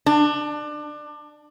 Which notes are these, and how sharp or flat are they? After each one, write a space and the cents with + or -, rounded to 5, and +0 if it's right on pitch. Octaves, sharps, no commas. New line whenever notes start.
D4 +25